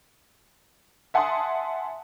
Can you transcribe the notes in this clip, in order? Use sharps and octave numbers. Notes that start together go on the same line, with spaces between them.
E5 F#5 G#5 A5 C6 D#6